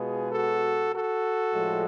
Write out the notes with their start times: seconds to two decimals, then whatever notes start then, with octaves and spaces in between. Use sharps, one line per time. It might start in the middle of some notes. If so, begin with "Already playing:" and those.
Already playing: B2 G#3 B3 F4 G#4
0.31 F#4 A4
0.93 F#4 A4
1.54 A2 F3 G#3